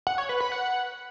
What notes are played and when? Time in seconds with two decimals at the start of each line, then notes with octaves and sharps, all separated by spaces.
0.07 F#5
0.18 C#5
0.29 B4
0.41 B5
0.52 F#5